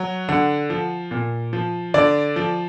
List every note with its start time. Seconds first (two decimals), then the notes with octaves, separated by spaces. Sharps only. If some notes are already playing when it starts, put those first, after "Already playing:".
Already playing: F#3
0.29 D3 F#5
0.70 F3
1.11 A#2
1.53 F3
1.94 D3 D5
2.36 F3